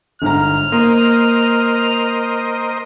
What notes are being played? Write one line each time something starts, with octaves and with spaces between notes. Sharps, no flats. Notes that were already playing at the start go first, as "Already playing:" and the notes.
G1 G#2 A#5 F6
A#3 A#4 C5 D#5